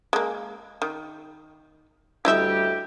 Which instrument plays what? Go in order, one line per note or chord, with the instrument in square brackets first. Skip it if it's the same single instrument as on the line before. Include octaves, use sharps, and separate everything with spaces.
[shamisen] G#3 A#3
D#3
[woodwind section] D2 G3 G4 [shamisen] E4 D#5 E5